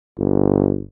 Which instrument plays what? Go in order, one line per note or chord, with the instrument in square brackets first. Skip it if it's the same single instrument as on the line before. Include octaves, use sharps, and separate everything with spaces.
[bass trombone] G1